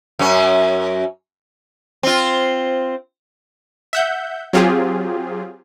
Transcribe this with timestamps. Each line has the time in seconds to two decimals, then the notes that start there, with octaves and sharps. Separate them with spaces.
0.19 F#2 C#4
2.03 C4 F4
3.93 E5 F#5 G6
4.53 F#3 C4 F4 G4 G#4